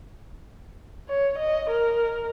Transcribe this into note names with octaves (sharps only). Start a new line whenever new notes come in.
C#5
D#5
A#4